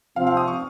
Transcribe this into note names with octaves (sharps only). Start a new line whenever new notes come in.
C3 F3 C4 F5
F5
D#6
C#6